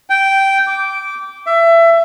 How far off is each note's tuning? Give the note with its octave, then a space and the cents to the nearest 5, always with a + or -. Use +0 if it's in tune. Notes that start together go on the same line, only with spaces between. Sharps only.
G5 -10
D6 -15
E5 +25